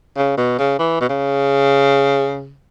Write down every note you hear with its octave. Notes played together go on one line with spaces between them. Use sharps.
C#3
B2
C#3
E3
B2
C#3